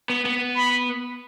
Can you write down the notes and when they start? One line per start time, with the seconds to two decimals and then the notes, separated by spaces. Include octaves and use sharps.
0.10 B3
0.26 B3
0.57 B5